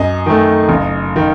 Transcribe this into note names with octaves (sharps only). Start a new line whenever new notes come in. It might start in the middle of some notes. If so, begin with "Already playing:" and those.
Already playing: F#2 D#5
D#3 A3
F#1
D#3